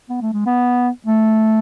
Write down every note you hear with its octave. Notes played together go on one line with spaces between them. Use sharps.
B3
A3
G#3
B3
A3